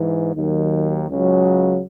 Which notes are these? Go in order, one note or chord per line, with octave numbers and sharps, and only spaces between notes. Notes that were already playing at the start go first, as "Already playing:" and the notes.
Already playing: G#2 E3
D#2 D#3 F#3
C#2 C#3 F#3